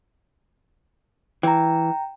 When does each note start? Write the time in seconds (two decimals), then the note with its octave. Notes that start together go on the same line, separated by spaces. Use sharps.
1.43 E3 G5 A#5